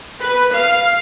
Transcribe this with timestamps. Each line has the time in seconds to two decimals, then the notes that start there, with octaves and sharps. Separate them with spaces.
0.19 B4
0.52 F5